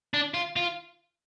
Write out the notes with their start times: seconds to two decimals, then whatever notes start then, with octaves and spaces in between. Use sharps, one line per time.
0.14 D4
0.34 F4
0.56 F4